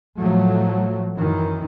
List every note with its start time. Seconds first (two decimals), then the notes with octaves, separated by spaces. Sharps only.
0.19 A2 F3 F#3 A3
1.13 F#2 D#3 E3